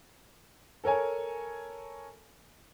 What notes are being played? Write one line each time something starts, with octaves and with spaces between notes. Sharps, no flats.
A4 A#4 C#5 G#5